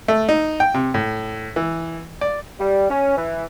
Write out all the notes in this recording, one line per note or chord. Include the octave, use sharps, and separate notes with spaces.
A3
D#4
G5
C3
A2
E3
D5
G3
C#4
E3